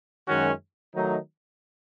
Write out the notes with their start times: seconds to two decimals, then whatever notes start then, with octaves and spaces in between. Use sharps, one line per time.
0.28 F#2 D#3 G#3 C#4 F#4
0.93 D#3 F#3 A3 D#4